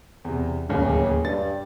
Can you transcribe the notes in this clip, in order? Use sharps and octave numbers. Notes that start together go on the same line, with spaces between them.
E2 C3
D1 D#2 C#3 C#4
G2 A6